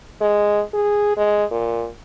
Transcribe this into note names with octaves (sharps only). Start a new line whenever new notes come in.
G#3
G#4
G#3
A#2